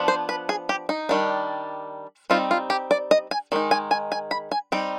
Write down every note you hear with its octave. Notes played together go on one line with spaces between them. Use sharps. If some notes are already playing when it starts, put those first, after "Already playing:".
Already playing: F3 B3 D4
C5
B4
G#4
G4
D#4
D#3 G3 D4
G3 C4 D#4 F4
F4
G4
D5
D#5
G#5
D#3 G#3 D#4
G#5
G#5
G#5
B5
G#5
G3 C4 D#4 G5